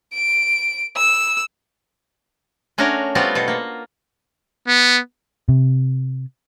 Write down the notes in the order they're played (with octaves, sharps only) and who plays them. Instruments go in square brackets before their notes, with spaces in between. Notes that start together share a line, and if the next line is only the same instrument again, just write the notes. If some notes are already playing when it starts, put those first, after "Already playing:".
[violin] D7
E6
[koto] A3 C#4 D4 F#4 A#4
G3 B3 C4 F4 F#4 F5
B2 A4
A#3
[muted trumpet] B3
[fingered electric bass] C3